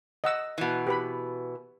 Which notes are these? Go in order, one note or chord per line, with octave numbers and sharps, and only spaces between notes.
D#5 F#5 E6
B2 E3
G4 B4 B5